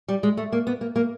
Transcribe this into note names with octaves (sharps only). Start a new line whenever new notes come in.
G3
G#3
A3
A#3
B3
A#3
A#3